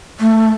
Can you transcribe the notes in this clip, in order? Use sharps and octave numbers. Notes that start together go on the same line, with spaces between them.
A3